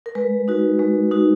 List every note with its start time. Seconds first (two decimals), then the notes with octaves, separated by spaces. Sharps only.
0.06 A#4
0.15 G#3 B4
0.48 D#4 F#4
0.79 G#3
1.11 D#4 F#4